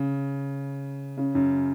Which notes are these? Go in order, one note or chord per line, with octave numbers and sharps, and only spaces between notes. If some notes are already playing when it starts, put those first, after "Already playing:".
Already playing: C#3
C#3
F#2